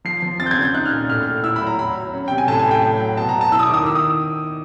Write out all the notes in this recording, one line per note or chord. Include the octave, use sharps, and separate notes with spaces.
F3 C7
F3
C4 A6
G6
G#6
C#3
G6
D#4 F#6
F6
A#2
A2 F6
A2
E4 E6
B5
F#3
A#5
F#3 B5
F#3
C#4
C3 G5
G#5
A2 A5
G#5
A2
G5
F#3
F#3
B2 A5
A#5
B2
A5
E4 E6
D#6
D6
D#3 D#6
E4 E6
D#6